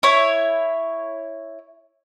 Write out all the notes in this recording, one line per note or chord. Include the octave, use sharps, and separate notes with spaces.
E4 C#5